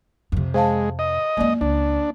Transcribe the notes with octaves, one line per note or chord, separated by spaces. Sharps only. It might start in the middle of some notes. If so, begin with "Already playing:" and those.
F2 C3
G#3 C5 F5 A5
D#5
F#2 G#3 A#3 D5
C#2 D4